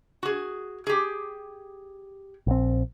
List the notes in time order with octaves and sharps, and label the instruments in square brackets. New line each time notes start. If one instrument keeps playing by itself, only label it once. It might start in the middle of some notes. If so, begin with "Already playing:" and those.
[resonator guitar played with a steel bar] F#4 G#4
G4 G#4
[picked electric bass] A#1 C4